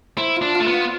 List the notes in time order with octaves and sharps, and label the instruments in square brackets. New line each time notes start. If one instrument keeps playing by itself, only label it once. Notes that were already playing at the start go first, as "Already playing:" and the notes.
[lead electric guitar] E4 [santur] C5
[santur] F4
[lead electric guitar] D4
[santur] F4
[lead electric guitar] A3
B3
[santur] F5